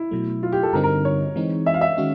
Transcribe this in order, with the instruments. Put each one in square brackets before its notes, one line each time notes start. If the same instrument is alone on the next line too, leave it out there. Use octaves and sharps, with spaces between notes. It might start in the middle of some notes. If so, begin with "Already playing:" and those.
Already playing: [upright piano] E4
[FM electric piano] B2 F#3 A3
[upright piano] F4
G4
A4
[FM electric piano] G2 D3 G3 C4 D#4 [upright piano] A#4
[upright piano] A#4
C#5
[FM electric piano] E3 G#3 C4 D#4
[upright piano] E5
F5
E5
[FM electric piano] D#3 G#3 C#4 F#4